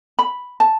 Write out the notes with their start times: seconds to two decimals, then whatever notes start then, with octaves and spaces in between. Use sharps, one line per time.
0.19 B5
0.60 A5